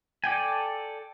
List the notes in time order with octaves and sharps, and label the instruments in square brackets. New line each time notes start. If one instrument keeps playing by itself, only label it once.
[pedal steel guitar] A4 D5 G5 G#5